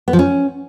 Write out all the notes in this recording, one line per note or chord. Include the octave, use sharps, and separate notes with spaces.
B3
F3
C#4